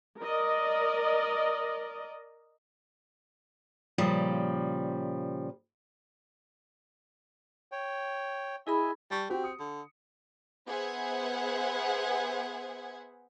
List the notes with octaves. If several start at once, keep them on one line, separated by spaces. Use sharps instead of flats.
A#4 D5 D#5
A#2 C#3 F3 G3
C#5 G5
E4 G#4 D#5 E5 G#5 B5
G3 A5 C#6
C4 F#4 G4
D#6 C#7
D3
B3 G#4 C5 E5 F#5 G#6